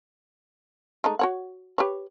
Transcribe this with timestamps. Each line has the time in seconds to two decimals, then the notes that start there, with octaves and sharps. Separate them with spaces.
1.04 G#3 A3 D#4
1.19 F#4 C#5 F#5
1.78 G4 B4 C#5